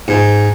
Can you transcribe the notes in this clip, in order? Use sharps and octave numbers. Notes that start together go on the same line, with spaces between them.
G#2